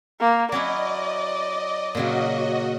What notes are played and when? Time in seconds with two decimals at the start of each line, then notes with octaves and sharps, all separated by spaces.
0.21 A#3
0.52 F#3 C#4 E4 D5 D#5
1.95 A#2 C#3 F#3 F#4 D#5